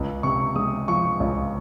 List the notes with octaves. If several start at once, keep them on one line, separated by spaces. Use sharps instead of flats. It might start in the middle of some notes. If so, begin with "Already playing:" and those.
Already playing: C#2
C3 C#6
G#3 D#6
F3 C#6
C#2